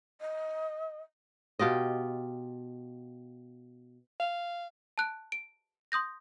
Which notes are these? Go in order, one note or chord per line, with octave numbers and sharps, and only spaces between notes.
D#5
B2 F4 G4 D#5
F5
A5 F#6 D7
D7
C6 D#6 G6 A#6